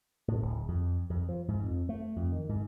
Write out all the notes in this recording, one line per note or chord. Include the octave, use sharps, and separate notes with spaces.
A2
D1
F2
F2
F3
G#2
F2
A3
F2
D#3
G#2